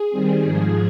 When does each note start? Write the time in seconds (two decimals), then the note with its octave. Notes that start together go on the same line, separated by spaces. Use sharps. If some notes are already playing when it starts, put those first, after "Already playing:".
Already playing: G#4
0.10 D#3 G3 C4
0.44 G#2 F3 G#3